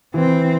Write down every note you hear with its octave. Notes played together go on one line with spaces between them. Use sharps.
E3 C4